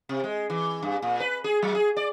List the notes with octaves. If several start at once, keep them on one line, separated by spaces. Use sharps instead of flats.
C3
G#3
E3
G2
A#2
B4
G#4
F#3
G#4
D5